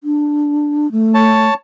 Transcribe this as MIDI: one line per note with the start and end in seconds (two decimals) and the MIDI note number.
0.04 0.90 62
0.92 1.49 57
1.14 1.54 73
1.14 1.54 81